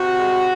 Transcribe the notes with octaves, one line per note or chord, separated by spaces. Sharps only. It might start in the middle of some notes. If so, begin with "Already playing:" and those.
Already playing: C3 F#4
G#3